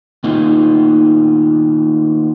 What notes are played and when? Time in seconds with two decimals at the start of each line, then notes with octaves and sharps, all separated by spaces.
0.24 D#3 A#3 B3 D#4 F4